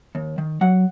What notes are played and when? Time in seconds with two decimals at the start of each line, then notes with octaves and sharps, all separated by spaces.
0.15 D#2
0.38 D#3
0.61 F#3 F#5